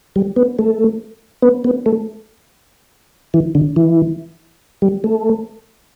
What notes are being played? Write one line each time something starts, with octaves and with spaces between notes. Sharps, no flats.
G3
B3
A3
B3
B3
A3
E3
D3
E3
G3
A3